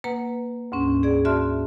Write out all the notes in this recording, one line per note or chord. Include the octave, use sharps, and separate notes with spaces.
A#3 B4 F#5 A#5
D2 G#2 C#4
G#4 D5 G#6
F#4 D5 E5 A5 C6 F6